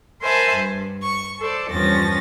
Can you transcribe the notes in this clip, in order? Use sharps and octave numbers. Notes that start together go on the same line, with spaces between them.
A#4 C5 E5 G#5 A5 B5
G2
C#6
A4 C5 D5
E2 G2 F3 C#4 A6 A#6